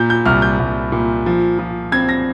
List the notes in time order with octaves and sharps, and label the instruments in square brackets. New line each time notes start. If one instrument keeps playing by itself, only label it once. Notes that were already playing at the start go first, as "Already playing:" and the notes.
Already playing: [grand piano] A#2 G6
G6
C2 F6
G6
C2
A#2
F3
F3
C4 G#6
A#6